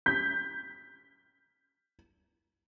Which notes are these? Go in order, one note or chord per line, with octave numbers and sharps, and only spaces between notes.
G6 B6